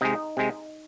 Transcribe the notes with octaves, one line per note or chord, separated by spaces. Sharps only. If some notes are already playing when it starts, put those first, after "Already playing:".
C3 G#3 D#4
C3 G#3